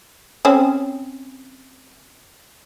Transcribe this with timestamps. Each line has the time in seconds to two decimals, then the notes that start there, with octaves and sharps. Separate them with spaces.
0.45 C4 C#4